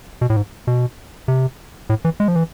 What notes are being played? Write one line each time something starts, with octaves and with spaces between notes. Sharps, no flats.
B2
A2
G#2
B2
C3
A2
E3
G#3
F3
E3